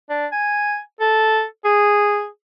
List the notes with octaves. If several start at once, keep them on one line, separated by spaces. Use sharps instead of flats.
D4
G#5
A4
G#4